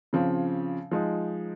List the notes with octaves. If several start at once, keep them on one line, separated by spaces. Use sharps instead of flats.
C#3 F3 C4
F3 G#3 D#4